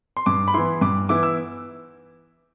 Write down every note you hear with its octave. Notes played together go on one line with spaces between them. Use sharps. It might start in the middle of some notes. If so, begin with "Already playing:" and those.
C6
G2 D6
B5
E3 B3 E4 C6
G2 D6
E3 B3 E4 D6
E6